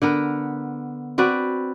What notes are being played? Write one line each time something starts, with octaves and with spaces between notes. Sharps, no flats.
D3 B3 A#4
C4 F#4 B4 D5